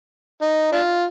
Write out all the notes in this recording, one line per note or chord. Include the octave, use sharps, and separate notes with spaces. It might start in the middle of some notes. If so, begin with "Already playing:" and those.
D#4
D4 F4